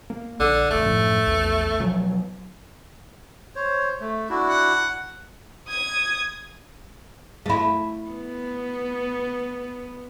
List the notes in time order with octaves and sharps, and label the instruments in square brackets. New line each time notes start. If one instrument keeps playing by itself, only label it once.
[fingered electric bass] A#3
[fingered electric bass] A#1 [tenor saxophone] D3
[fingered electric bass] E1 A1 [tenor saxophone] A3
[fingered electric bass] F#2 A2 F3
A#1 E2
B2 F3 F#3
[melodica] C5 C#5
A3
D4 E4 F#4
[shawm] F#5
[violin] D#6 G#6
[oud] A3 E4
[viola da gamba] B3